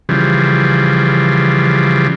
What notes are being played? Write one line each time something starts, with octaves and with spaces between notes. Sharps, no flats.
C#3 E3 F3 G3